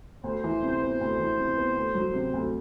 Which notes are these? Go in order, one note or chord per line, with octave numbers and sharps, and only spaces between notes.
D2 C5
E3
C3
B3
D2
E3
C3
B3
D2
F#3
C3
D2